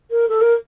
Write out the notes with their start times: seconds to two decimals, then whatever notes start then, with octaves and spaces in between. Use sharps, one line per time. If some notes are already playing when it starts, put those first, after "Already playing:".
0.11 A#4
0.28 A4
0.41 A#4